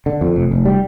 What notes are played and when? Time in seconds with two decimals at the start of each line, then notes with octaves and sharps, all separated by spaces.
0.06 D3
0.21 F2
0.36 F1
0.51 F1
0.65 G3